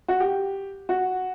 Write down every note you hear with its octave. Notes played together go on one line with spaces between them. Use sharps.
F#4
G4
F#4